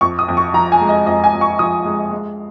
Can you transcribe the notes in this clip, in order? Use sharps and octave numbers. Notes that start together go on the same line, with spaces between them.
F2 C#6
D#6
F2
C#6
F3 A#5
G#5
G#3
D#5
F2 D#5
G#5
F2
C#6
F3 D#6
G#3
G#3